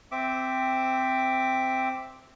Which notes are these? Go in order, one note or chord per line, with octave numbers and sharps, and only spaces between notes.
C4 E5 D6